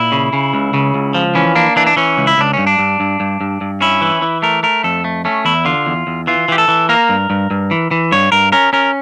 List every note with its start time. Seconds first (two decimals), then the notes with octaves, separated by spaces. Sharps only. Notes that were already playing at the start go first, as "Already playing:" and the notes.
Already playing: A#2 E4
0.12 C#3
0.33 C#3
0.54 C#2
0.74 C#3
0.94 C#2
1.14 F3
1.35 E3 C#4
1.55 A#3 D4
1.76 E3 D4
1.86 D4
1.96 E3 C#4
2.18 C#2
2.27 E4
2.38 C#2 D4
2.54 G2 C#4
2.67 D4
2.79 G2
3.00 G2
3.20 G2
3.41 G2
3.61 G2
3.81 C#4 E4
4.01 E3
4.22 E3
4.42 A3 A#4
4.63 A3 A#4
4.84 F2 A4
5.04 A3
5.25 A3 C#4
5.45 E2 E4
5.65 D3 F4
5.87 E2
6.07 E2
6.27 E3 F4
6.48 E3 G4
6.58 A4
6.68 E3
6.89 A#3 A#4
7.09 G2
7.30 G2
7.51 G2
7.71 E3
7.91 E3
8.12 G2 C#5
8.32 G2 A#4
8.52 C#4 A#4
8.73 C#4 A#4